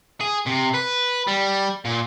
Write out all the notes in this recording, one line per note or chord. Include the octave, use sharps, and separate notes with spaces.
G#4
C3
B4
G3
A#2